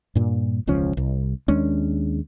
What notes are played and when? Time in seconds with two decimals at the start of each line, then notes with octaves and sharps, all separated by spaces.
0.15 G2 A#2
0.67 E1 C#2 F3 C#4
0.97 C2
1.48 D#2 G#3 C#4 D4